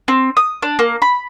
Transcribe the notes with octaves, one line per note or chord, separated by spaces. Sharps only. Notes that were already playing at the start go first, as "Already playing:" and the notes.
C4
D#6
D4
A#3
B5